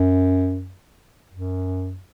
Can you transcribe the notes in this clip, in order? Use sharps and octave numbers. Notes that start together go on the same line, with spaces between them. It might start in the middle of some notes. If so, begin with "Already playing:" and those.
Already playing: F#2
F#2